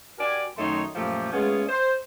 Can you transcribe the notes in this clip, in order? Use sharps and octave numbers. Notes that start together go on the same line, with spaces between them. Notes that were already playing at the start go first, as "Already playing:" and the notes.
F#4 G4 A#4 D5 G#5
F#2 D#3 A3 D#4 C#5 C6
F#2 A#2 F3 A3 A#3 G4
G#3 A3 B3 C#4 F4 G#4
C5